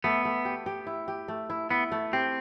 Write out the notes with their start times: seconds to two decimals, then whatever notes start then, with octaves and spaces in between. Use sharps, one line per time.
0.04 A3 B3
0.25 A3
0.45 G4
0.66 G4
0.87 E4
1.08 G4
1.28 A3
1.50 E4
1.70 B3 E4
1.92 A3
2.13 C4 G4